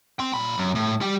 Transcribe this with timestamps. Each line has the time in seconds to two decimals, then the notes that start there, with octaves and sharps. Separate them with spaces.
0.19 G5 C6
0.34 A#2 B5
0.58 F#2
0.75 A2
1.01 G3 G4